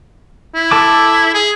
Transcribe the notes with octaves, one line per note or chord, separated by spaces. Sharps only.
E4
A4 A5 D6
G#4